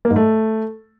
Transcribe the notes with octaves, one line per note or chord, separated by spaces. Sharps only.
A#3
G#2
A3